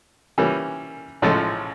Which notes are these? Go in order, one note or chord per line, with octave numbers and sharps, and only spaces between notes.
E3 G3 A#3 C#4
A1 A2 F3 G#3 C#4